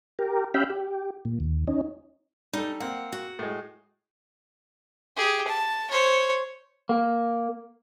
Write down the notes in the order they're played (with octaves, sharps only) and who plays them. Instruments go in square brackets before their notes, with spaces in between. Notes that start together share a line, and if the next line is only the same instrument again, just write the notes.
[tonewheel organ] G4 A#4
C#4 G4 E5 F5 G5 B5
G4
A#2
D#2
C#4 D#4
[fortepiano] G3 A4 [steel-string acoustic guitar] D#4
[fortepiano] A#3 C4 [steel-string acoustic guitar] F#5
[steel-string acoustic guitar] F#4
[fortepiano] A2 G#3
[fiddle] G4 G#4
A5
C5 C#5
[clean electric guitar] A#3